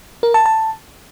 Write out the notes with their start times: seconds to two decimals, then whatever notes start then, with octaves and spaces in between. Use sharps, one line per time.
0.23 A#4
0.34 A5
0.46 A5